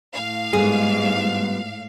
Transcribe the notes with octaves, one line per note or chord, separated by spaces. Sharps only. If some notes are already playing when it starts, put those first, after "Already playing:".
A2 F5
G#2 G3 B3 F4 G#4